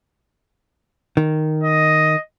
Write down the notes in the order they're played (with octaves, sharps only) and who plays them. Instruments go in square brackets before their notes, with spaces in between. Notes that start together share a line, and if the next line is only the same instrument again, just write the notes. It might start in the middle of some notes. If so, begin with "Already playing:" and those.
[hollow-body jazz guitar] D#3
[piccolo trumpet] D#5